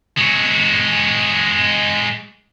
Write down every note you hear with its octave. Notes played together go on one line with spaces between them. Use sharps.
G#3 F#4